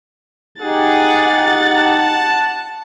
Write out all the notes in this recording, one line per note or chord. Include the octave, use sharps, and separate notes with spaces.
D#4 G4 G#4 F#5 A6
A5